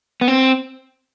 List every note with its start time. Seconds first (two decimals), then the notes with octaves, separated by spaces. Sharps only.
0.21 B3
0.28 C4